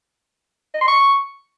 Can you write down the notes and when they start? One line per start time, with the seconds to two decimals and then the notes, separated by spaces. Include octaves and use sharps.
0.74 D#5
0.81 C6
0.88 C#6